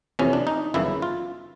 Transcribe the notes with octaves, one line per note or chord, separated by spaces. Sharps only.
F2 C3 E3 C#4
D4
D#4
G1 F#2 C#3 E3 E4
F4